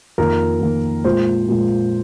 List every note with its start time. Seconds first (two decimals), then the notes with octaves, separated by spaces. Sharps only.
0.18 F2 D#3 A#3 A#4
0.61 F2 D#3 A#3
1.04 A#2 F3 G#3 C5
1.48 A#2 F3 G#3